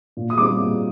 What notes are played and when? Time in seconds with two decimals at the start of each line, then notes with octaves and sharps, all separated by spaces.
0.17 A#2
0.30 D#6
0.38 G3 C4 D#4 D6
0.60 A#2